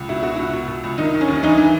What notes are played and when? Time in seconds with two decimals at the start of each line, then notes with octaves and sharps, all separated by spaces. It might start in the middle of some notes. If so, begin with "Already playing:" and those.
Already playing: C#2
0.09 B2 E4
0.23 B2 F#4
0.36 C#2 E4
0.53 B2
0.68 B2
0.84 C#2
0.98 D#3 D#4
1.14 D#3
1.21 C#4
1.28 D#2
1.43 E3 D#4
1.58 E3